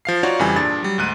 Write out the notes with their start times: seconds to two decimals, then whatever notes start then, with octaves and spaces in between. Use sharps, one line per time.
0.05 F3 F5 C7
0.23 D#4 F4 F#4 C#5 D5 F5
0.39 F2 C#3 E3 G3 G#5
0.56 G2 A#2 D4 G#4 A6
0.83 F#3 G3
0.98 D2 G#2 F#6 D#7